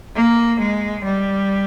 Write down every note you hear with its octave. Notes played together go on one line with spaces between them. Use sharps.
A#3
G#3
G3